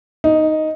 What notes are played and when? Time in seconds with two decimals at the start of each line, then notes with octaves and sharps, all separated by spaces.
0.24 D#4